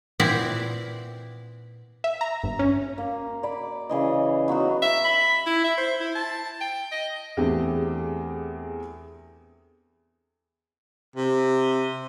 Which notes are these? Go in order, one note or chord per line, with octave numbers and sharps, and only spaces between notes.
A#2 B3 C4 E4 D5 E5
E5
A#5
G1
C#4
A#3
D5 B5
C#3 E3 D#5
F#3 B3 D#4 F#4
E5
B5
E4
E5
C5
E4
A5
G5
D#5
E2 A3 C4 D4 G4 G#4
C3